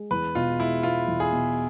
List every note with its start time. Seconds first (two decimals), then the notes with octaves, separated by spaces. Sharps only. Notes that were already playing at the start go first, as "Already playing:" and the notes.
Already playing: G#3
0.11 E2 B4
0.35 B2 F4
0.60 G#3 E4
0.83 B3 F4
1.08 E2
1.20 G#4
1.32 B2